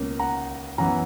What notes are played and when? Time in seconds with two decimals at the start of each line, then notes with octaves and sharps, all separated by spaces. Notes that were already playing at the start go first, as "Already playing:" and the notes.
Already playing: C#2 B2 A#3 C#4
0.19 F#5 A#5
0.78 F#2 E3 B3 F#5 A#5